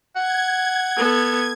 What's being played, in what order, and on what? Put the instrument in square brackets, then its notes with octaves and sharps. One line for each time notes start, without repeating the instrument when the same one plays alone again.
[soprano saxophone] F#5 [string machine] G#6
[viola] B3 A4